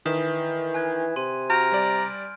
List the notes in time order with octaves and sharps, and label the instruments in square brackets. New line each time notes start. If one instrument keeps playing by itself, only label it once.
[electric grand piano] D#3 [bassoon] E3 [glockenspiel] D#6 B6 E7
[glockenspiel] G#5 F#6 G#6
[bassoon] C3 [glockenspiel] C6 D#7
[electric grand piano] F#4 [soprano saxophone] A#5 [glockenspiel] F6 G6 D7
[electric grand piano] G3 D5